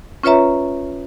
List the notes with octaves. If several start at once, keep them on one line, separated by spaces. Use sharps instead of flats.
C#4 F4 B4 C#5 E5 A#5